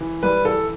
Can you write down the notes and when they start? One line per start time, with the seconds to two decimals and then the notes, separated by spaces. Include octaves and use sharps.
0.01 E3
0.23 G3 B4
0.45 E3 A4